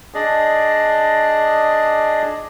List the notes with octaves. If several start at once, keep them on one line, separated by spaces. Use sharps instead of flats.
D4 G#4 D5 D#5